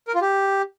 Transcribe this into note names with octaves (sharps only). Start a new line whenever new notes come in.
A#4
F4
G4